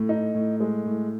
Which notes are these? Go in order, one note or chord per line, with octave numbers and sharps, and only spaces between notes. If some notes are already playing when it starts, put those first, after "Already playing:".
Already playing: A2
D#4
A2
G#3
A2